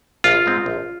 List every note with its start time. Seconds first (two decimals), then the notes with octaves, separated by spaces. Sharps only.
0.24 A#1 F4
0.46 G#2 G#3 C4
0.66 A#1